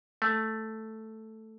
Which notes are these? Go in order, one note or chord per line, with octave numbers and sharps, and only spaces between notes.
A3